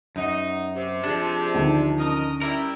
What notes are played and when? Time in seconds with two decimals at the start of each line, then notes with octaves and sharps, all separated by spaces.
0.16 F#2 D#4 F#5
0.75 C3
1.04 F3 D4 G4 G#4 D5
1.54 D2 D#3
1.98 C#4 A#4 D#5
2.41 G3 E4 A#4